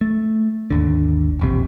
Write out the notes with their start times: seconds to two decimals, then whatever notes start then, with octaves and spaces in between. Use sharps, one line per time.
0.01 A3
0.70 G#1 D#2 D3
1.39 E1 A#1 C3